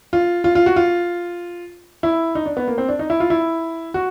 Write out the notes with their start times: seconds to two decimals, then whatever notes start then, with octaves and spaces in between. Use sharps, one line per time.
0.13 F4
0.44 F4
0.55 F4
0.66 F#4
0.76 F4
2.03 E4
2.35 D#4
2.46 D4
2.57 B3
2.68 A#3
2.78 C4
2.88 D4
2.99 D#4
3.10 E4
3.20 F4
3.30 E4
3.94 F#4